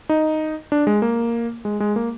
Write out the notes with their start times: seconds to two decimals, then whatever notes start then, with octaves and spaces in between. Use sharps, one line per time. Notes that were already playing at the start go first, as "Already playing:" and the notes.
0.09 D#4
0.72 D4
0.87 G#3
1.02 A#3
1.65 G#3
1.80 G#3
1.96 A#3